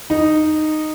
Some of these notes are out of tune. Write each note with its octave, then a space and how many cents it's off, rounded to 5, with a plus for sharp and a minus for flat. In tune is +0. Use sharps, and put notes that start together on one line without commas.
D#4 -10